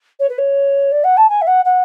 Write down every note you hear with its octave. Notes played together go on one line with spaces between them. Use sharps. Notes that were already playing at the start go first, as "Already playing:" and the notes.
C#5
B4
C#5
D5
F#5
A5
G#5
E5
F#5
F#5